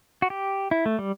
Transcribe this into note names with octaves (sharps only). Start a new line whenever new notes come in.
F#4
G4
E4
A3
G3